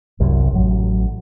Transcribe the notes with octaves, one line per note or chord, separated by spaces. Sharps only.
G1 C2 F#2
A1 F#3